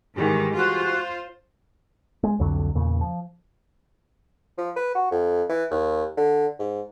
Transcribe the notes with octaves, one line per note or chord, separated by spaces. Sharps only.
G#2 D#3 E3 G3 G#3
F4 F#4 C5
G#3
C2 F2 D3 F#3
E2 A#2 C#3
F3
F3
B4
F#4
F2
E3
D#2
D3
G#2